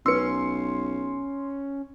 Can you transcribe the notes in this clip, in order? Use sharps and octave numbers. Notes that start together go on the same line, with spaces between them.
B1 C#4 B4 C6 E6 C#7